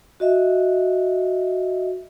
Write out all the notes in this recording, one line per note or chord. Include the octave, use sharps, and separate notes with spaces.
F#4 D#5 E5